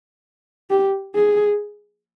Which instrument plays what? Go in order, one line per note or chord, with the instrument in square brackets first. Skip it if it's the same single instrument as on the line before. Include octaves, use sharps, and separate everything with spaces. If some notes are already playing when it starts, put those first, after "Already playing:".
[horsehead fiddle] G4
G#4